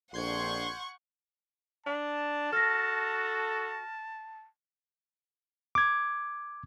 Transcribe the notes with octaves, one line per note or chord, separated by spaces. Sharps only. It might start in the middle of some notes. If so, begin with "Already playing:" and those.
A#1 F2 D4 F#5 C6 C#6 G6 G#6
D4 A5
F#4 A4 F6 A#6
D6 G#6